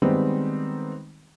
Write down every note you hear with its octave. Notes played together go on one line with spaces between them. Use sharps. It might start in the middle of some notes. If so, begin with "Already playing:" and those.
D#3 G3 G#3 B3 C4 D#4